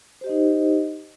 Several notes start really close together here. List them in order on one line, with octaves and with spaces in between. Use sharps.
C5 G4 D#5 D#4